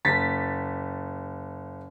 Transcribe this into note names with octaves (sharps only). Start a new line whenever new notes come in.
F#1 A6 B6